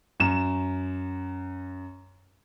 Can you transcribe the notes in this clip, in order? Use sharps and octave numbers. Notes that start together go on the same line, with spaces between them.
F#2 E7